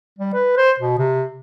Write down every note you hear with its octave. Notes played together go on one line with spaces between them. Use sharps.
G3
B4
C5
B2
C3